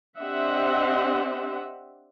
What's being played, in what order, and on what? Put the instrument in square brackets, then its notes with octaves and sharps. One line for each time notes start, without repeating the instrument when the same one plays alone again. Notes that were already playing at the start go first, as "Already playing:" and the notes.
[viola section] C4 D4 G4 D#5 E5 F#5